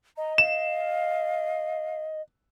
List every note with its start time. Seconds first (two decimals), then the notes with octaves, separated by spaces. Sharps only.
0.17 D#5 A#5
0.38 F5 E7